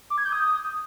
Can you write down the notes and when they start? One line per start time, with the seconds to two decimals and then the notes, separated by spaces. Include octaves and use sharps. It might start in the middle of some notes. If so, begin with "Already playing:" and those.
0.10 D6
0.18 G#6
0.25 G6
0.32 D#6